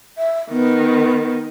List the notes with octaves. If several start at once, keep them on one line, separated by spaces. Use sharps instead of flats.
E5
D#3 B3